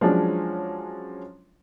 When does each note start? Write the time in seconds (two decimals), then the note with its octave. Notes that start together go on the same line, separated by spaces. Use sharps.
0.01 F3 F#3 G#3 C#4 D4